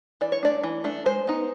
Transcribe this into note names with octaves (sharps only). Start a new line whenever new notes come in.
E3 D5
C#5
A3 D4 D5
E3
A3 D4
G#3 C5
B3 D#4